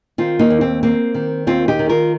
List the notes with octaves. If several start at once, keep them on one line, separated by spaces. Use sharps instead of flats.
D#3 C4 F4
A#3 D#4
D#2
C4
A#3 C4
D#3
D#2 C4 F4
D#4 G4
D#3
F4 A#4